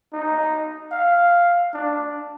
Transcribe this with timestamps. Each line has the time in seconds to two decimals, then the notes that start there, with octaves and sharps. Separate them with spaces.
0.13 D#4
0.92 F5
1.74 D4